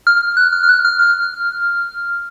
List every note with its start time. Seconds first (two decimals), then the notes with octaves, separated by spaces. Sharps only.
0.07 F6
0.37 F#6
0.52 F6
0.63 F6
0.69 F#6
0.85 F6
0.99 F6